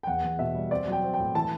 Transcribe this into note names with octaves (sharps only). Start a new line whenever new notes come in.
G5
E2 F#5
E2
B2 E5
G3
C4 D5
F#3
G5
C4
G5
A2
E3 A5